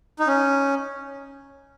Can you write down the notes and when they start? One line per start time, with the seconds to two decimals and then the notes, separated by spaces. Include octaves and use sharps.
0.19 D#4
0.27 C#4